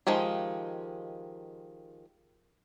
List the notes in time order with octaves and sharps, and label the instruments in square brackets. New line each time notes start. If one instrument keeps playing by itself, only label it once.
[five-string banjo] D#3 F3 G#3 G4